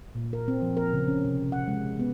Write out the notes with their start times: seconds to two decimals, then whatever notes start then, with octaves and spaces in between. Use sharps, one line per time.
0.15 A#2
0.33 A#4
0.48 C4
0.62 F3
0.77 A#4
0.93 C#3
1.08 C#4
1.25 C3
1.52 F#5
1.68 G#3
2.00 B3